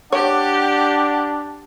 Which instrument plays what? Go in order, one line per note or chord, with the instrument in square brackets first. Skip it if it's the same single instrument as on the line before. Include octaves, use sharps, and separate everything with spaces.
[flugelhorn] D4 [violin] G4 [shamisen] C#5 [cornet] F#5